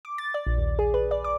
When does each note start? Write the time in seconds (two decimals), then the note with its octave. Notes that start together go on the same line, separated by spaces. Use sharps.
0.05 D6
0.18 A6
0.34 D5
0.46 A#1
0.58 D#2
0.79 G#4
0.94 B4
1.11 D5
1.24 D6